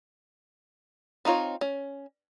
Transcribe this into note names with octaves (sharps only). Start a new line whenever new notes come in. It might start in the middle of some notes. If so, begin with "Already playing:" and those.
C4 D#4 F4 C#5
C#4